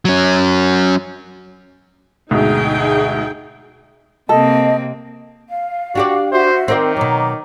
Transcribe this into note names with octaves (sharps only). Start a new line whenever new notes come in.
F#3 C#4
D2 G#2 B2 D#4 G#4 G5
C3 A#3 C4 A4 D#5
F5
D4 F#4 G4 D5
F#4 C5 E5
D#3 C4 A#4 D5
B2 F#3 A#5 D6